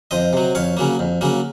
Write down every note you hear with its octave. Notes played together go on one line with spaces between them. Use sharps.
F2 C5 D#5
C3 F#3
F2 C#5 F5
C#3 F#3 A#3
F2
C#3 F#3 A#3